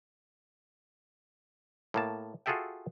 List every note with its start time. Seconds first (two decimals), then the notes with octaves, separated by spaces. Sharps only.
1.94 A2 A#3 A5
2.46 F4 F#4 G#4 A4 E5 G5